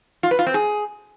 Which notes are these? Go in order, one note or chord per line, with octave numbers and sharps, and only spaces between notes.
F4
B4
F4
C4
G#4